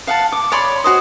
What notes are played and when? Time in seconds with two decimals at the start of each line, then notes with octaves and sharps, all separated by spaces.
0.07 F5 F#5 A5
0.32 D6
0.52 C#5 D5 B5 C6
0.84 F#4 C5 D#5